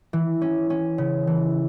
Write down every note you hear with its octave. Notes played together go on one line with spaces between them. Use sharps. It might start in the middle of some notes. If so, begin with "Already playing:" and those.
E3
C#4
C#4
C#3
E3